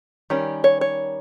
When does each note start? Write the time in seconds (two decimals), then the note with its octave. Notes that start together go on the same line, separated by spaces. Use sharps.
0.30 D#3 G3 C#4
0.64 C#5
0.81 C#5